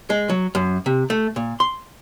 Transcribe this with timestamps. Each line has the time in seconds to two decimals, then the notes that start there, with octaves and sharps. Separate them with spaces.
0.10 G#3
0.29 F#3
0.55 F#2
0.86 C3
1.10 A3
1.36 A#2
1.60 C6